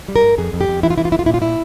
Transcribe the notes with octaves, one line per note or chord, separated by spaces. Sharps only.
G3
A#4
G2
F2 G#4
F2
G4
F2
E3 E4
F4
E3 E4
F4
F2 E4
F4
A#2 E4
F4
A#2 E4